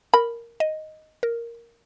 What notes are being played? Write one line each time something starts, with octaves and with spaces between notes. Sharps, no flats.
A#4 B5
D#5
A#4